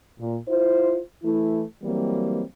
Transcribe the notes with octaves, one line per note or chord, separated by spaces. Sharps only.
A#2
E4 F4 C5
E3 A3 E4
E3 F#3 G3 A#3 C4